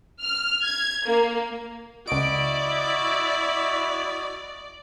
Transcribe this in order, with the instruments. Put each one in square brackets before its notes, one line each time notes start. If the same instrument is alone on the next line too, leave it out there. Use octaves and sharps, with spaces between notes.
[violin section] F6
G#6
A#3
[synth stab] C#2 D7 [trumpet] E4 [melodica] F#4 D#5 [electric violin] D5